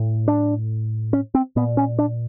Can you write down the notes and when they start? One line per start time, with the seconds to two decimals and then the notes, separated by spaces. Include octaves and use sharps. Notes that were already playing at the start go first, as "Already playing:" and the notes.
Already playing: A2
0.28 D4
1.13 C#4
1.35 C4
1.56 A#2 B3
1.77 C#4
1.99 D4